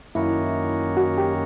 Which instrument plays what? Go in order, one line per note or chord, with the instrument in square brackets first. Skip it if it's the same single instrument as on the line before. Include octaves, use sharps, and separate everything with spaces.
[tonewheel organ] F#2 D#3 F#3 A#3 C#4 [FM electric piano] E4
[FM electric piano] F#4
G4